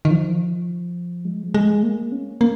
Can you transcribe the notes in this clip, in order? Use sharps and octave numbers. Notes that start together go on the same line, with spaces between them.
D#3
F3
G#3
F3
G#3
A#3
C#4
A#3